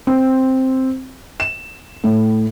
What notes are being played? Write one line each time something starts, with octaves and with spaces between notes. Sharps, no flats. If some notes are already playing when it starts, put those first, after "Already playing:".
C4
E7
A2